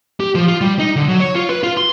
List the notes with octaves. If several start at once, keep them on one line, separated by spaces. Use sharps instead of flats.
G4
F3
F4
G3
D#4
D3
F#3
C#5
F4
B4
F4
C6